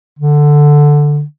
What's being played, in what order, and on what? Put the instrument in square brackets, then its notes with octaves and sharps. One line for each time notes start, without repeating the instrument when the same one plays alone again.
[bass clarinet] D3